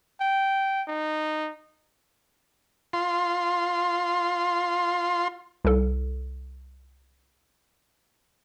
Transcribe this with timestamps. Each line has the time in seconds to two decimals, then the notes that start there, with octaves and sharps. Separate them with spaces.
0.21 G5
0.87 D#4
2.93 F4 C6
5.65 C2 A4